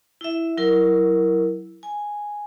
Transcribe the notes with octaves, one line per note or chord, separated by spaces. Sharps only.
E4 E5
F#3 E4 A#4
G#5